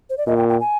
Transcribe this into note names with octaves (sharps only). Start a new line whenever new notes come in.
C5
D5
A#2 D#5
G5
G5
G#5